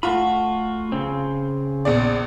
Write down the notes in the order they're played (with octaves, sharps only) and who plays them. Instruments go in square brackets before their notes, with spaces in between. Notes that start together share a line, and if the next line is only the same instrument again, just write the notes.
[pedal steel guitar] A3 F#4 B5 [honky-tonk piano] F4
[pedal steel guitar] C#3 C4
[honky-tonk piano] A#1 E2 D5